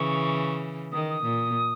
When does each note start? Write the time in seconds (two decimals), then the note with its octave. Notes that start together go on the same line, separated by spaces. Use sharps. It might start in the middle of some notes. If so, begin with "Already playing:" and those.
Already playing: C#3 E3 C#6
0.92 D#3 D#6
1.10 D#6
1.23 A#2